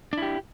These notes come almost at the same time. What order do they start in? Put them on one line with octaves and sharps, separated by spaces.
D4 E4 G4